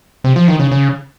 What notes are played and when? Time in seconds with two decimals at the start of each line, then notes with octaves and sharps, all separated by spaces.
0.24 C3
0.36 F3
0.48 D#3
0.60 C#3
0.71 C#3